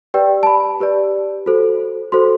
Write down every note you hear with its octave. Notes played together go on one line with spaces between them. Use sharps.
G4 B4 D5 G5
A5
B5
G4 B4 D5
F#4 A4 C5
F#4 A4 C5 C6